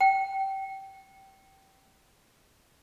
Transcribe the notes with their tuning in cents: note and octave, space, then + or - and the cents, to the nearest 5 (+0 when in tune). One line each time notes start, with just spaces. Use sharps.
G5 -20